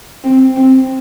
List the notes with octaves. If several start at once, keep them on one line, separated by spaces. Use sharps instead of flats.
C4
C4